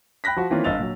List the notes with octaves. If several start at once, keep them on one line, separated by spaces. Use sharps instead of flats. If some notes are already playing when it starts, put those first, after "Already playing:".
G5 B5 F#6 A#6 B6
F3 F#4
D#3 E3 A#3 C4 C#4 F4
G1 D#5 F5 E6 A6 F7
A#2 F#3